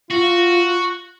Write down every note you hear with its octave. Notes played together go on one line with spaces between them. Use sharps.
F4 F#4